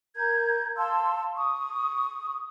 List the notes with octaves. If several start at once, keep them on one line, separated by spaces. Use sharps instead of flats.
A#4 A#5 G6 G#6
F5 A5 C6 E6
C#6 D#6